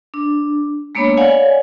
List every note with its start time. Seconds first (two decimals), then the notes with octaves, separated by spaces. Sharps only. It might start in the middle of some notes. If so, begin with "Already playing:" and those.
0.14 D4
0.95 G#3 A#3 B3 D4 C#5 B5
1.17 C#5 D5 F5 F#5 G#5